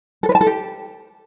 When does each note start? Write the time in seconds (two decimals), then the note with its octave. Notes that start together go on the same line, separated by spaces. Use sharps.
0.23 A4
0.29 B4
0.35 A5
0.41 A4
0.47 G4